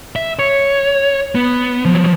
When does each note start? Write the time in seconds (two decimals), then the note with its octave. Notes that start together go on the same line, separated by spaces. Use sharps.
0.16 E5
0.39 C#5
1.35 B3
1.85 F3 F#3